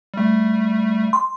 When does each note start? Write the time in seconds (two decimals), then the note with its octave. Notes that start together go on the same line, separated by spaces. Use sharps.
0.14 G3 A3
1.13 C6